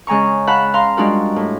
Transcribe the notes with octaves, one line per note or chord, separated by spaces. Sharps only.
C#3 G#3 G#5 A#5 C#6
F5 F#5 A5 B5 F#6
F5 A#5 C6
G3 G#3 D4 F4 F#4 A#4
A2